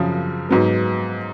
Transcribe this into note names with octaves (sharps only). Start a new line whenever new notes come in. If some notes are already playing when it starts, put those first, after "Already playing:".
Already playing: F#2 C#3 F3
G#2 F#3 B3